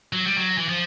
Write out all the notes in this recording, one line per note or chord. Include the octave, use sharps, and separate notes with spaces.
F#3
G3
F#3
E3
F3